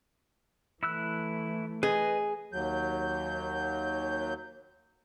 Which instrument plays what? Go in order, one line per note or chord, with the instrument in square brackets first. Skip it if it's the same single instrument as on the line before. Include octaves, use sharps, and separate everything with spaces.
[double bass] E3 A3 [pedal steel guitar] E4 E6 F#6
[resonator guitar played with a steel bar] G#4 [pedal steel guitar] B4 D#5
[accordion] D#2 F#3 G6